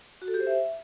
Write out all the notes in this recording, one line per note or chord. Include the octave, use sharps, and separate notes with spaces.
F#4
A4
G4
C5
E5